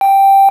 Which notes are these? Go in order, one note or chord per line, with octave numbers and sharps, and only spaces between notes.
G5